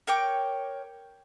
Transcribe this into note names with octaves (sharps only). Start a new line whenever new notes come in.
A#4 C#5 G5 D6